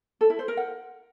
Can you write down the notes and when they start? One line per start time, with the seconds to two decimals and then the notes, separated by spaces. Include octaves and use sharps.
0.21 A4
0.30 E4
0.39 C5
0.48 A#4
0.57 F#5